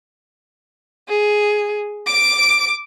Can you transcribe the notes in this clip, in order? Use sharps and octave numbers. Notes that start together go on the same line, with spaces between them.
G#4
D6 D7